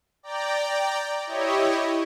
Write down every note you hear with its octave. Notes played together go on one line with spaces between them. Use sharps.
D5 G5 A#5
E4 G4 C#5 D#5